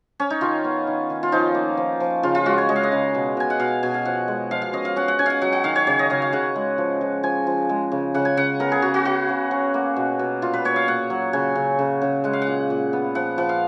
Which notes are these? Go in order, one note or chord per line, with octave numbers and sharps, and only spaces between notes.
C#4
D#4
D#3 F4
B3
D#3
D#3
F4
F3 D#4
A#3
F3
F3
C#3 F4
F4
G#3 F#4
C#5
G#3 D#5
F5
D#5
C#3
B2
B2 G#5
F#5
B2 F5
B2 G#5
F5
F3 F#5
G#3
F3 F5
F5
C#4 D#5
F5
C#4 F#5
F#5
C#4 G#5
F5 F#5
F#3 F#5
F#5
D#3 F5
C#5
C#3 C#5
D#5
C#3 F5
F5
C#3 F#5
G#3
F3
F3
F3 G#5
F3
G#3
C#3
C#3 F#5
G#5
C#3 F#5
B3 A#4
G#4
C#3 F#4
F#4
B3 F#4
C#3
C#4
A#3
B2
B2
A#2 F4
B4
A#2 C#5
F5
A#2 F#5
F#3
C#3 G#5
C#3
C#3
C#3
G#3 F#5
F5
F#5
A#2
A#2
B3
F3 F#5
F3 F#5
F5